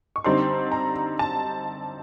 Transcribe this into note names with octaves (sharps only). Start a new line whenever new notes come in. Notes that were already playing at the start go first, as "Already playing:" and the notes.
C#6
D3 G3 C4 D#4 C6
A#5
A5